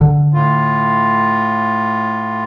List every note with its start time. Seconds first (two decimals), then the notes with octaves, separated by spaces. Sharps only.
0.01 D3
0.34 A2 F4